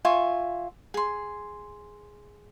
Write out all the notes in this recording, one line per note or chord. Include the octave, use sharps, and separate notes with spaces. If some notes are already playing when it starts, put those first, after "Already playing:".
F4 E5 G#5 C#6
G#4 C6